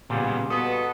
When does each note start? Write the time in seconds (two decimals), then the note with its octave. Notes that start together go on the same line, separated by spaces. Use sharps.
0.10 A#2 C#3 G3 B3 G#4
0.50 B2 B3 A4 D#6